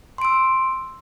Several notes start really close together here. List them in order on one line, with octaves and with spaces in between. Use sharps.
C6 D7 E6